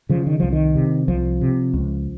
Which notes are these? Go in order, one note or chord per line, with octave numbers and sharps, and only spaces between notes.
C#3 F3
D#3
C2 F3
D#3
C3
C2 F3
C3
C#2